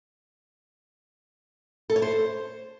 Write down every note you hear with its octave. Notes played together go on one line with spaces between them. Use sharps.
A4
C#5
C5